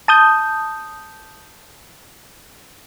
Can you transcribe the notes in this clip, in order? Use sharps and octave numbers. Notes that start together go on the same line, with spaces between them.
A5 D#6 G6